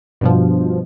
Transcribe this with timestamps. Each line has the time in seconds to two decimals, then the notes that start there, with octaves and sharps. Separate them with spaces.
0.21 G2 B2 F3